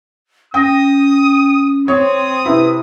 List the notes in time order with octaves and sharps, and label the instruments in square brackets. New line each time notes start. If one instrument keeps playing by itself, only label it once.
[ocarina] C#4 [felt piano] G5 A#6 [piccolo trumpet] D#6
[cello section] C4 [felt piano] C#5 [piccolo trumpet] D#6
[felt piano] C3 E4 [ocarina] B4